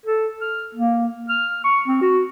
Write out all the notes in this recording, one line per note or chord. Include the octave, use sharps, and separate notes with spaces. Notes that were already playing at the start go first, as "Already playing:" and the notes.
A4
F6
A#3
F6
C#6
C4
F#4